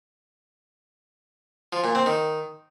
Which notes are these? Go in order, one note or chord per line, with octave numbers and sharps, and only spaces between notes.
F3
A#2
C4
D#3